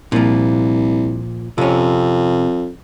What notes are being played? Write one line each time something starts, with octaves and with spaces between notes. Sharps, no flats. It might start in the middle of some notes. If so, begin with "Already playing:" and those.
C2 A#2 F3
F2 C3 C#4